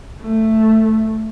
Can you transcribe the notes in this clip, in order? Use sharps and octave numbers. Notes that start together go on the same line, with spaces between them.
A3